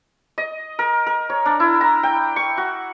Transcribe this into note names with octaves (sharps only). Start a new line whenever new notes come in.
D#5
A#4
A#4
C#5
D4
E4
A#5
G5
C#6
F#4